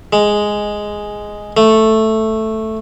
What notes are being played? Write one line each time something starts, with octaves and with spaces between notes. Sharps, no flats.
G#3
A3